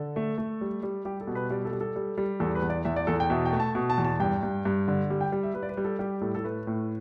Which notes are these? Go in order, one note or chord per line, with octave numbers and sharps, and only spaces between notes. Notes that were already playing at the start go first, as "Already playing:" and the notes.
Already playing: D3 A4
A3
A3
G3
G3
G3 G4
A4
B2
B4
G3 D5
A4
G3
A4
G3
G3
E2 A4
B4
E2
D5
E2 E5
D5
E2 A4
G5
B2 E5
G5
A3
A5
B2
A5
E2
A5
G2 G5
G2
G2
D3
G3
G5
G3
E5
G3 B4
D5
B4
G3
A4
G3 G4
A2 A4
A4
A3 B4
A2